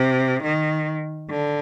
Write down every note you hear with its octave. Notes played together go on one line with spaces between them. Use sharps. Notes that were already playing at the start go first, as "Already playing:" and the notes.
Already playing: C3
D#3
D3